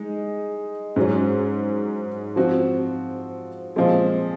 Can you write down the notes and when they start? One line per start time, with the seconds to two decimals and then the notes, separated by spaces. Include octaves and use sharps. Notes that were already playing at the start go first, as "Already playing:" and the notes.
Already playing: G#3 D#4
0.96 G#2 F#3 C#4
2.36 F3 C4 F#4
3.76 A#2 F3 G#3 C4